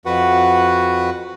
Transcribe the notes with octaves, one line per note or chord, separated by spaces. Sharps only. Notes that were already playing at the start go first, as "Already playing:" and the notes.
F2 F#4 B4 F#5